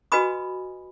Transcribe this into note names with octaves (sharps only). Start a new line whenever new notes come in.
F#4 B4 D#5 G#5 B5 D#6